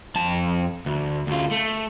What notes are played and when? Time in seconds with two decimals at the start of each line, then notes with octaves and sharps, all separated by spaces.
0.16 F2 A5
0.86 D2
1.27 D2 F4
1.51 A3